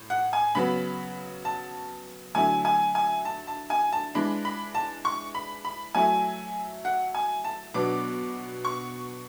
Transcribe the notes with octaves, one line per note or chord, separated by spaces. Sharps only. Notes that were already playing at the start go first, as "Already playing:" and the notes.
Already playing: A2
F#5
G#5
C#3 F#3 B3 B5
A5
D3 F#3 A3 E4 G#5
G#5
G#5
A5
A5
G#5
A5
E3 G#3 D4 B5
B5
A5
C#6
B5
B5
F#3 A3 E4 G#5
F#5
G#5
A5
B2 F#3 B3 D4 D6
C#6